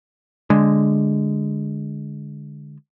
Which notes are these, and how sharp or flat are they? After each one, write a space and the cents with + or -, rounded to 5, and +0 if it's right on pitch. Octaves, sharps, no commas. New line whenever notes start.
D3 +0 G#3 +0